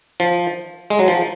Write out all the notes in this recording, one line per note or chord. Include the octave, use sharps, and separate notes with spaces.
F3
G#3
F#3
F3